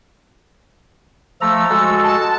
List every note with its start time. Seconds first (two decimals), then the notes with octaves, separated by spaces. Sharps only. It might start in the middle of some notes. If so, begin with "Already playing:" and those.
1.41 F3 A3 A#5 E6
1.70 G#3 F#4 A4
2.03 A5